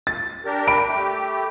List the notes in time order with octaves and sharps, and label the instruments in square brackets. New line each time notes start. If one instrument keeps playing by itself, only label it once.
[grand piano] A6
[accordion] D4 G4 A#4
[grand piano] B5 D7
[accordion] A3 G4